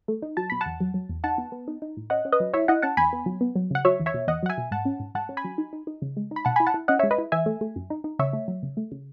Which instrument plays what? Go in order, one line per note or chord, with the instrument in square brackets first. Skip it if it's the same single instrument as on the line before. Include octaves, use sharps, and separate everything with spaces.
[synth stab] A3
D#4
F#3 A5
B2 B5
E2 F#5 A5
F#3
F#3
E2
D#4 F#5 A5
B3
B3
D#4
D#4
A2
C#4 D#5 F#5
C#4
B4 D#5
F#3
E4 C#5 E5
E4 D#5 F#5
C#4 F#5 A5
E2 G#5 B5
B3
F#3
B3
F#3
C#3 F#5
F#3 C#5 E5
E2
C#5 E5
B2
E2 D#5 F#5
F#3 F#5
E5 G#5
B2
G#2 F#5 A5
C#4
G#2
G#2 F#5 A5
C#4
G#5 B5
F#3
D#4
D#4
D#4
C#3
G#3
D#4
B5
B2 F#5 A5
E4 G#5 B5
F#5 A5
E4
C#4 D#5 F#5
G#3 C#5 E5
B4 D#5
E4
E3 E5 G#5
A3
A3
F#2
D#4
D#4
C#3 C#5 E5
A3
F#3
C#3
A3
C#3